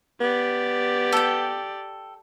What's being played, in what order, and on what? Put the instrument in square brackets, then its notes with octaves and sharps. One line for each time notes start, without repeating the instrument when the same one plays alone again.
[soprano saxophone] B3 [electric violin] G4 D5
[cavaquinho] A4 G5